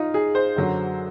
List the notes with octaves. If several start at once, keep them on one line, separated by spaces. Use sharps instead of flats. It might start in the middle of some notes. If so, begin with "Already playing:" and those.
Already playing: D#4 F4
G#4
C5
F#2 D3 F#3